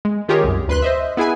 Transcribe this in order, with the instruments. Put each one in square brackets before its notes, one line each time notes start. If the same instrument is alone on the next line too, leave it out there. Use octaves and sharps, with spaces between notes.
[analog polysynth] G#3
D#3 F4 G4 G#4 A#4 C#5
C2 F#2
D2 B4 C6 F#6
C5 D#5 E5
B3 E4 G#4 B4 G#5